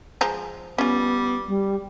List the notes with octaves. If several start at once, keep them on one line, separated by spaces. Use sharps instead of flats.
F3 G#3 A#5
G3 B3 C#4 F4
G3